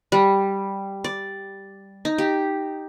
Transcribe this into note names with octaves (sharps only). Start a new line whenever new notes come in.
G3
D5
D#4
G4